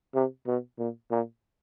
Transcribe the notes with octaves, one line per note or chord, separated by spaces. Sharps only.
C3
B2
A#2
A#2